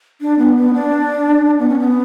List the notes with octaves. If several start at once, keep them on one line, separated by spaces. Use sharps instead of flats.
D4
B3
B3
D4
B3
C#4
B3